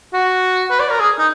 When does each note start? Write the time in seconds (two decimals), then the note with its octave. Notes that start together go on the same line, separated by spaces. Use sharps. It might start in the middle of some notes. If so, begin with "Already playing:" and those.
0.13 F#4
0.71 B4
0.80 D5
0.89 A#4
1.00 G#4
1.18 D#4